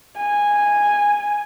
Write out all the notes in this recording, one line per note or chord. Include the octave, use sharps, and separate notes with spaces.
G#5